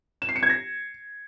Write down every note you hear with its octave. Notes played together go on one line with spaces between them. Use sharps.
E7
C7
C#7
G#6
A#6